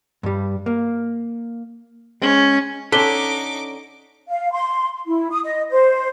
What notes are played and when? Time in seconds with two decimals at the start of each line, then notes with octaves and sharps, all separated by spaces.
0.23 G2 G3
0.66 A#3
2.22 G#3 C#4
2.92 D3 C#4 D#4 A4 D6 B6 G7
4.29 F5
4.52 C6
5.06 E4
5.30 D#6
5.44 D#5
5.70 C5